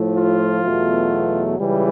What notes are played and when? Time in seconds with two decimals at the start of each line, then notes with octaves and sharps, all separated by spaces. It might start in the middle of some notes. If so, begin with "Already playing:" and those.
Already playing: A2 F3 A3
0.17 F4
0.64 E2 B2 F#3 A3
1.58 C#2 C#3 E3 G3